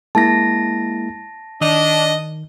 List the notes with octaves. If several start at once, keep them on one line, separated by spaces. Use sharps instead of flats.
G#3 A#3 E4 A5 A#6
D#3 D4 D#5